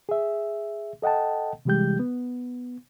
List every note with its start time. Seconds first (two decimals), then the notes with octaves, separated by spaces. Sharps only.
0.09 G#4 E5
1.02 A4 D#5 F#5 G5 A5
1.65 C3 E3 G3 G#3 G4 G6
1.99 B3